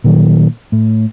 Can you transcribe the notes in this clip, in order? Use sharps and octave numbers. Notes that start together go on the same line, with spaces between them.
A#2 D#3 F#3
A2